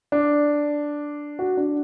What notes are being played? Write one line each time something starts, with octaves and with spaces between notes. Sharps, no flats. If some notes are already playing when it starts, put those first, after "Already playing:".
D4
F#4
D4